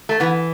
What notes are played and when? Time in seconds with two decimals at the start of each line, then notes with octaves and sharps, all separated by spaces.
0.09 A3
0.20 E3 B3